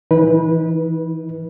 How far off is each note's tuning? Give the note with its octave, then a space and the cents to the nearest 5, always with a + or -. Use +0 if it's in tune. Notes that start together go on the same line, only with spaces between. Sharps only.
E3 +0 D#4 +35 B4 -20